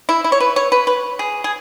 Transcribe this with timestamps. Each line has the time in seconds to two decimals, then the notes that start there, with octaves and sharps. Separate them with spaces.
0.09 E4
0.24 E4
0.32 C#5
0.40 B4
0.56 C#5
0.72 B4
0.87 B4
1.19 G#4
1.44 G#4